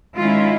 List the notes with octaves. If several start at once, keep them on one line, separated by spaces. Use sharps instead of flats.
D#3 G#3 C#4 E4 F4